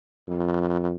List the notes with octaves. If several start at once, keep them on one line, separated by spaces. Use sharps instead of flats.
F2